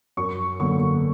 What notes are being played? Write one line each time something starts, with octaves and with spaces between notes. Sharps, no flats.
F#2 C#6
D3 F#3 A#3 C#6